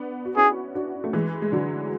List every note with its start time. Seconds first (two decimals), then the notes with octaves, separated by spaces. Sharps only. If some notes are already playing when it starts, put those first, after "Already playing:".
Already playing: B3 D4
0.25 F#4
0.36 C#4 E4 G#4
0.75 D4 F#4
1.04 A3
1.13 E3 G#3
1.42 G#3
1.52 D3 F#3